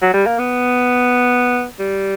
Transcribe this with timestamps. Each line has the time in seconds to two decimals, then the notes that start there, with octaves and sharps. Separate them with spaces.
0.02 F#3
0.14 G3
0.26 A#3
0.39 B3
1.80 G3